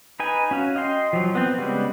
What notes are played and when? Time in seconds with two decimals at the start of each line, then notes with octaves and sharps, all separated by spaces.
0.20 D#4 B4 G#5
0.51 C#4 F#4 F5
0.76 D#5 G5 C6
1.13 F3 F#3
1.35 B3 C4
1.58 C#3 G3 G#3 B3